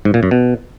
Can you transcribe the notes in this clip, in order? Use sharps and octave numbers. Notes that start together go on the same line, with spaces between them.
G#2
A#2
F#2
B2